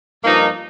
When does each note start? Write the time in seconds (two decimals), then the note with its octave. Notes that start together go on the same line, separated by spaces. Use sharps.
0.24 G2 F3 A#3 D#4